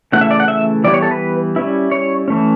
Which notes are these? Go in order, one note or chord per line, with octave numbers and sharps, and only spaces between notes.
C#3 E3 A3 E4 F#5
E5
D5
F#5
E5
E3 G3 B3 E4 D5
C#5
A4
B4
G3 C#4 E4
C#5
E3 A3 C#4